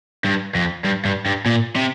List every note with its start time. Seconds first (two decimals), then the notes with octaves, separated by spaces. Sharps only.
0.24 G2
0.55 F2
0.85 G2
1.05 G2
1.26 G2
1.46 A#2
1.76 C3